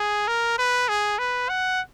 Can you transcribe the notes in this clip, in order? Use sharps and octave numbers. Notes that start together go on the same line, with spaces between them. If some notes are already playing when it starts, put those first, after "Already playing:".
Already playing: G#4
A#4
B4
G#4
B4
F#5